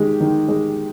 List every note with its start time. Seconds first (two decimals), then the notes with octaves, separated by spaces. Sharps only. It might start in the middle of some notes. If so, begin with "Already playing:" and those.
Already playing: D#3 G#3 G4
0.20 D#3
0.48 G#3